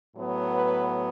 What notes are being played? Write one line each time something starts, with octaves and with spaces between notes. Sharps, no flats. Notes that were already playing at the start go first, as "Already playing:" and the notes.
A2 F#3 B3
B4